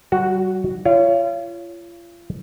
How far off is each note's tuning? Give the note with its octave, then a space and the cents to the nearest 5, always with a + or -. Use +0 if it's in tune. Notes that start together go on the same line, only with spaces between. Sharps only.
G3 -45 F#4 +0
F4 -35 C#5 +20